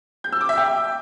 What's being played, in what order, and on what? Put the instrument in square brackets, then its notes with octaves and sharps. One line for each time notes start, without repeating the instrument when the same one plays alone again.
[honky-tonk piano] G6
E6
D6
E5
G5